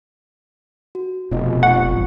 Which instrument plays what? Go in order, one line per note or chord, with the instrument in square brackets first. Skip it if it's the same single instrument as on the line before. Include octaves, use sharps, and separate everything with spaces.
[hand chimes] F#4
[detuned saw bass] F1 [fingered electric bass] B2 [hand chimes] F4 D#5
[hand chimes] F4 C#6 [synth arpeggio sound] F#5
[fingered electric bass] A1 E2 G2